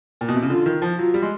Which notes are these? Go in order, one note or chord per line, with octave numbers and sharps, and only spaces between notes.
A#2
B2
C3
C#3
D3 F4
D#3
F3
F#3 F4
G3
G#3